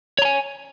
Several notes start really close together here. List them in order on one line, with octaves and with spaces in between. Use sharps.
C#5 A#5 G#5